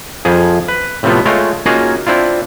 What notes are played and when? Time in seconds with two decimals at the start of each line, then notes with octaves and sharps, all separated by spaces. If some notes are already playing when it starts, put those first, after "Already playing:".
0.25 F2 F3 G#4
0.68 B4
1.03 A2 C3 F3 A3 B3 F4
1.25 G#3 A3 F4 C#5 G5
1.66 A#3 C#4 D#4 F4 F#4 G#4
2.07 C4 D4 E4 F4